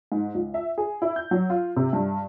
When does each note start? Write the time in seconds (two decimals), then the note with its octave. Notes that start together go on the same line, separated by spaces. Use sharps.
0.12 G#2
0.35 C#2
0.54 E5
0.78 G#4
1.02 E4
1.16 G6
1.31 F#3
1.50 F4
1.76 C3
1.93 G2